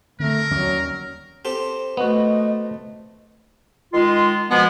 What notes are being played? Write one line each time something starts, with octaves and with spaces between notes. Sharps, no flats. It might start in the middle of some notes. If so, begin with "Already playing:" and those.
D3 D#3 A3 C4 A#4
D#2 F#3 G3 C#4
C4 G4 A4
A3 B3 F#4 D#5
D#3 G#3 F4
B2 F3 G#3 B3